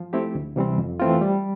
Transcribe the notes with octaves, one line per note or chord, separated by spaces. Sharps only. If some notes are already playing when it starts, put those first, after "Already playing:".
Already playing: F3
A3 C4 E4 G4
D2
C3 E3 G3 C4
F2
E3 A3 C4 F4
G3